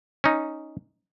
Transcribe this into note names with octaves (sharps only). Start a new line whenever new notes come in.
C#4 D#4